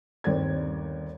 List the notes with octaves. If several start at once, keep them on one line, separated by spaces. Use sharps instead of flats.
G1 D#2 C4 D5 G#6